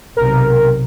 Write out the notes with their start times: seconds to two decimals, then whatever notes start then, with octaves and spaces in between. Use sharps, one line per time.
0.17 B1 C3 A#4